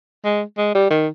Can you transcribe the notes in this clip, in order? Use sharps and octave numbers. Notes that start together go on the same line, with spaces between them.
G#3
G#3
G3
D#3